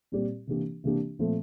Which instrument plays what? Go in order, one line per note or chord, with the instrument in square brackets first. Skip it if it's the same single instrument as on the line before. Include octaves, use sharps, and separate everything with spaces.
[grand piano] A#2 G3 C4 G4 D5
C3 E3 A#3 D4 G4
C3 E3 A#3 D4 G4
A#2 F3 A3 C4